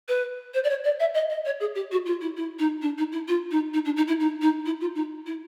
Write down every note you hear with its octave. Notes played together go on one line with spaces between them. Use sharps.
B4
C5
D5
C#5
D5
E5
D#5
D#5
C#5
G#4
G4
F#4
F4
E4
E4
D#4
D4
D#4
E4
F4
D#4
D#4
D4
D#4
E4
D#4
D#4
E4
F4
D#4
E4